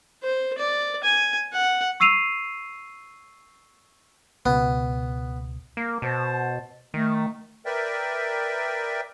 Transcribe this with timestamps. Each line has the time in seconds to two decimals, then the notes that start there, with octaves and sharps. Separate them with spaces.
0.23 C5
0.58 D5
1.04 G#5
1.53 F#5
2.00 C#6 E6 C7 D#7 F7
4.46 C#2 B2 B3
5.77 A#3
6.02 B2 C5 A5
6.94 D#3 A3
7.66 A#4 B4 D5 E5 G5